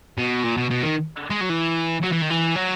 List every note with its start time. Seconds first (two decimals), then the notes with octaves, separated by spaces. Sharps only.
0.18 B2
0.44 A#2
0.57 B2
0.71 B2
0.83 D#3
1.31 G#3
1.41 F#3
1.50 E3
2.03 F#3
2.12 E3
2.21 D#3
2.30 E3
2.56 F#3